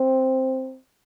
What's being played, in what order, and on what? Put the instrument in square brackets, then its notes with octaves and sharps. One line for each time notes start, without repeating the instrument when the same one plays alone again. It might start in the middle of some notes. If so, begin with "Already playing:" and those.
Already playing: [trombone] C4